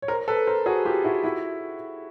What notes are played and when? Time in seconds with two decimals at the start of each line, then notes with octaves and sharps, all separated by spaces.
0.02 C#5
0.08 A#4 C5
0.28 A4 B4
0.47 A#4 C5
0.66 F#4 G#4
0.85 F4 G4
1.04 E4 F#4
1.23 E4 F#4